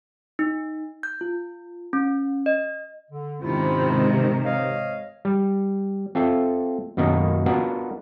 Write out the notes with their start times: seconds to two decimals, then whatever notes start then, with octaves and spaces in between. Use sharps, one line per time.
0.39 D#4
1.03 G6
1.21 F4
1.93 C#4
2.46 D#5
3.11 D3
3.41 G#2 C3 D#3 C#4 E4 F4
4.45 C#5 D#5 F5
5.25 G3
6.15 C4 F4 A4 E5
6.97 F#2 B2 D#3 A#3 D#4
7.46 B3 D4 F4 F#4 A#4